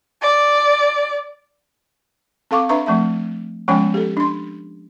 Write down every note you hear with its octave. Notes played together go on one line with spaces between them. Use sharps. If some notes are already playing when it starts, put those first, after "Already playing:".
D5
C4 A4 F5 C#6 D6
D4 B4 E5 A#5 C#6
F3 A3 C4 E5
F3 G#3 B3 C#4 C#5 G5
G4 A4
D4 C6